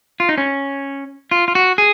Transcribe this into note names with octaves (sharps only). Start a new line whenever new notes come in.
F4
D#4
C#4
F4
F4
F#4
G#4